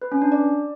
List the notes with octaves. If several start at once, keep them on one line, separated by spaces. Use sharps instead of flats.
B4
C#4
D4
D5